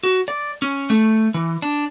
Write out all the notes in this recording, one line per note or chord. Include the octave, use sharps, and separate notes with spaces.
F#4
D5
C#4
A3
E3
D4